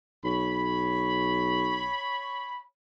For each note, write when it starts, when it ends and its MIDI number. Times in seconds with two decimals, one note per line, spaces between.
0.24 1.92 35
0.24 2.63 73
0.24 2.63 83